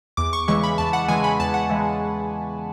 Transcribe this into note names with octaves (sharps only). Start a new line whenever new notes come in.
E2 D6
C#6
C#3 E3 G#3 C#6
B5
E2 A5
F#5
C#3 E3 G#3 G#5
B5
E2 A5
F#5
C#3 E3 G#3